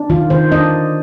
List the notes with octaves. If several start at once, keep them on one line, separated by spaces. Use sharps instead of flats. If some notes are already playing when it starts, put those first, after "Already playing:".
Already playing: D4
D#3 F4
D#3 C5
D4 D#5